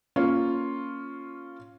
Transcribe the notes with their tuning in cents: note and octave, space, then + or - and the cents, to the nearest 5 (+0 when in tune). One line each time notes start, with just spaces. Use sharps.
A#3 +0 C#4 +0 F4 +0